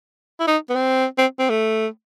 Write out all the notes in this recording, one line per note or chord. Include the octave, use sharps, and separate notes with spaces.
E4
D#4
B3
C4
C4
C4
A3